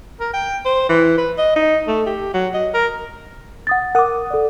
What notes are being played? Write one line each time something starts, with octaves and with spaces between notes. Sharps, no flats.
A#4
G5
C5
E3
B4
D#5
D#4
A3
G4
F#3
D#5
A#4
F#5 D#6 A6
A#4 F#5 D6 D#6
A4 D5